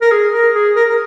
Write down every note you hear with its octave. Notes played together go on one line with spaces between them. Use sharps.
A#4
G#4
A#4
G#4
A#4
A#4